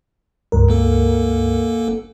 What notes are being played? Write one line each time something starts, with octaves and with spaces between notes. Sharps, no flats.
C#2 G2 A#4
G1 A#3 A4